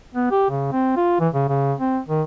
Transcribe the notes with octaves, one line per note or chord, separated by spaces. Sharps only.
B3
G4
C#3
C4
F4
E3
C#3
C#3
C4
D#3